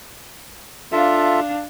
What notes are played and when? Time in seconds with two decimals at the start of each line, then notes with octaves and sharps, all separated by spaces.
0.92 D4 F4 A4 E5 F5